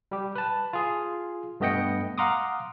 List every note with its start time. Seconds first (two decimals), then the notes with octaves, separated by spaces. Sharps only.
0.11 G3 G4
0.35 B4 A5
0.73 F4 G#4
1.60 G2 A3 B3 D#5 G5 C#7
2.18 F5 F#5 A#5 C6 D6 D#6